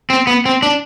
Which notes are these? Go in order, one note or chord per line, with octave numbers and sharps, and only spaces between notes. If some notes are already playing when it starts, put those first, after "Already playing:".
C4
B3
C4
D4